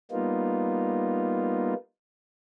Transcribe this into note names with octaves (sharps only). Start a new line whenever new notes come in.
G3 A#3 B3 D#4 F4